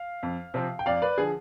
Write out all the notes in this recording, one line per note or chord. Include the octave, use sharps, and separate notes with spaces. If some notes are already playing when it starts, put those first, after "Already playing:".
Already playing: F5
F2
C3 F3 C4
G5
F2 D5 F5
B4 D5
D3 F3 G#4